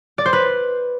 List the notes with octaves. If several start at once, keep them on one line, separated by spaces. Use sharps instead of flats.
D5
C5
B4